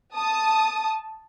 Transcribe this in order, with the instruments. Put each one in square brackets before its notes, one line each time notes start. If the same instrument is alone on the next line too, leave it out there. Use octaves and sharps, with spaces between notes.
[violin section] A5 D#6